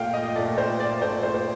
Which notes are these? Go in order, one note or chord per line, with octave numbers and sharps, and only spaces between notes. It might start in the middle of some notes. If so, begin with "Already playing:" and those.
Already playing: A#2 A3 F5 G5
D#5
A#2 A3 D5
C5
D5
A#2 A3 C5
C5
C5